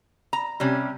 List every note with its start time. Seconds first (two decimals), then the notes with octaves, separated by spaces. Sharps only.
0.33 A#5
0.60 C3 G3 C#4